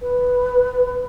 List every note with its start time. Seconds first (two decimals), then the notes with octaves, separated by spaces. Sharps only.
0.01 B4